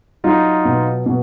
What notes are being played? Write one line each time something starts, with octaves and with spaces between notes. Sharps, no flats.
F#3 D#4 F4
B2
B2